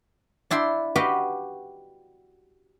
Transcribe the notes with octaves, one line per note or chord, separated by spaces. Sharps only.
D4 E4 G5 C6
F#4 G4 B4 D#5 F5 G5